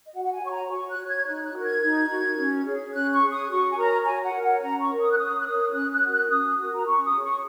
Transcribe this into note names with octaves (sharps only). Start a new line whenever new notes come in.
D#5
F#4 F#5
F#5
G#5
C#5 C#6
A#5
F#4 C#6
F#6
C#5
G#6
D#4 F#6
F#6
F#4 A#4
G#6
D#4
F#4 A#4
C#4
G#4 C#5
C#4 F#6
C#6
G#4 C#5
D#6
F#4 C#6
G#5
A#4 C#5 A#5
F#4 G#5
F#5
A#4 C#5
F#5
C#4 A#5
C#6
A#4
C#5 D#6
F#6
C#4 D#6
F#6
A#4 C#5 D#6
C#4 F#6
F#6
F#4 A#4
F#6
C#4 D#6
F#4 A#4
A#5
C#4 C#6
D#6
G#4 C#5
C#6